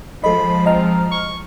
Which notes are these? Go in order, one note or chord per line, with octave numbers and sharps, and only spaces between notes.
F3 G#3 A4 D#5 B5
C4 D#5 A#5 F6
C#6